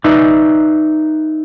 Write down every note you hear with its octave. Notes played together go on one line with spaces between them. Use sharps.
D#4 B4 D5 E5